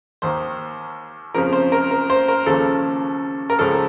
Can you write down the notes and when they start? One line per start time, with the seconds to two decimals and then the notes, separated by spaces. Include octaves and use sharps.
0.22 D#2 D#3 C5
1.34 F2 C#3 F3 A#4
1.53 C5
1.72 A#4
1.91 A#4
2.10 C5
2.28 A#4
2.46 D#2 C#3 F3 A4
3.50 A#4
3.59 C#2 C#3 F3 A4